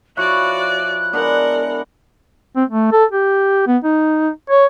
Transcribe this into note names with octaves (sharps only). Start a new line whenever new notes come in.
F3 E4 F#4 C#5 D5 F#6
F#6
G#3 B3 D4 A#4 F#5
C4
A3
A4
G4
B3
D#4
C#5